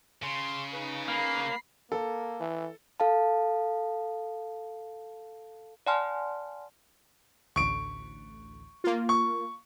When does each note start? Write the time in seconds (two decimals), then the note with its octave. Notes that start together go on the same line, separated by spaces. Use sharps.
0.23 C#3 C6
0.71 D#4 B4
1.08 A#3 B5 C7
1.92 A#3 A4
2.40 E3
3.00 A4 F5 A5
5.87 D5 F#5 G#5 A5 C6 F6
7.56 A1 D2 C#6 D7
8.84 A#3 F4
9.09 C#6